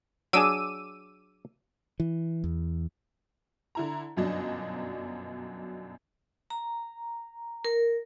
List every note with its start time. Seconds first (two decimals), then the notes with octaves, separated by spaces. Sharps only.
0.33 F#3 D4 G#4 D6 E6 D#7
2.00 E3
2.44 E2
3.75 D3 E4 A#5
4.17 G1 F#2 B2 F#3 D4 D#5
6.50 A#5
7.65 A#4